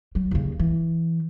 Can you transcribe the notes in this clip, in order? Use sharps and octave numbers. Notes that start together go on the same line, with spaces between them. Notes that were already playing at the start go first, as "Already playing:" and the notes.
F#3
D#2 C#3
E3